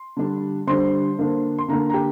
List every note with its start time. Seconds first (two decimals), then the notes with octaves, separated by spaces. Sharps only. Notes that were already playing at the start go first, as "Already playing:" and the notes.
Already playing: C6
0.17 D3 G3 D4
0.67 D3 G3 D4 C5 C6
1.19 D3 A#3 D4
1.59 C6
1.68 D3 A#3 D4 A#4 A#5
1.90 A#5
1.94 G4 G5